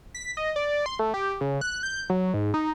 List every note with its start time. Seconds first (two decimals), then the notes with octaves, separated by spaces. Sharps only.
0.15 B6
0.37 D#5
0.56 D5
0.86 C6
0.99 A3
1.14 G4
1.41 C#3
1.61 F#6
1.83 G6
2.10 F#3
2.34 G#2
2.54 D#4